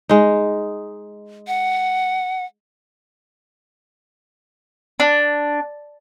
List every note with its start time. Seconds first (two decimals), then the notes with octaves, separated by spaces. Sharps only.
0.09 G#3 D#4
1.47 F#5
5.00 D4